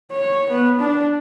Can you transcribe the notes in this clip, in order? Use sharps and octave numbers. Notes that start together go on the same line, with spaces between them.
C#5
B3
D4